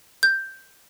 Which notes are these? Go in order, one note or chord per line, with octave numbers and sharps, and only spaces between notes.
G6